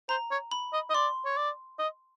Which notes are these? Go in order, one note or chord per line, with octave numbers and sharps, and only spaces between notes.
C5 A#5
C#5
B5
D#5
D#5
D5 C6
C#5
D5
D#5